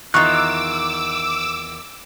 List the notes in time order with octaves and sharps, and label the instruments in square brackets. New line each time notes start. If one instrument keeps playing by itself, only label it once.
[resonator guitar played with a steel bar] E2 D#3 [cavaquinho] F4 A#5 C#6 [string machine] D6 E6 [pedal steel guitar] F#6